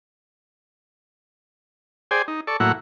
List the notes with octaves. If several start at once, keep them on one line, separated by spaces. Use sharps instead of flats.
G#4 C5 D5 G5 G#5
D#4
A4 D5 C#6
A2 F#3 A#3 E4 F#5